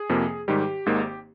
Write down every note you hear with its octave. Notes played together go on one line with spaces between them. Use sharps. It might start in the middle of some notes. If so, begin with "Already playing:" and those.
Already playing: G#4
F2 C3 F3 A#3
G#2 D#3 G3 G4
G#1 G#2 D#3 A#3